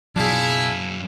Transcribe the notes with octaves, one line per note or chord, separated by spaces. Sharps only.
F#2 B2 F#3 D4 E4 F4 G#4 F5